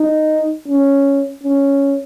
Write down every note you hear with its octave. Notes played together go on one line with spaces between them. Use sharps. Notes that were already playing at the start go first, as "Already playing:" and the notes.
Already playing: D#4
C#4
C#4